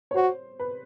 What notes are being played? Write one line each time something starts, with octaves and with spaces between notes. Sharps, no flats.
C#5
F#4 C5
B4